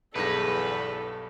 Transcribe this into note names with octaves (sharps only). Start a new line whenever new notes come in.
B1 E2 G2 A4 B4 A#6